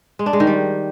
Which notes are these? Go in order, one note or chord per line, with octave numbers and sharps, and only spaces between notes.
G#3
D4
G#3
D#3
G3